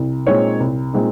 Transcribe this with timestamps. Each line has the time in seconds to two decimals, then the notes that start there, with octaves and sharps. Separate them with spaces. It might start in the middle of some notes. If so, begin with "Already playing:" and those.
Already playing: C2
0.26 A#2 G#3 C4 D#4 C#5
0.60 C2
0.93 A#2 G#3 C4 D#4